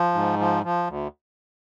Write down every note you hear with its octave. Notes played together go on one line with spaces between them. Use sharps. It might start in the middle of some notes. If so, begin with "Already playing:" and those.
Already playing: F3
G#2
F3
F3
D2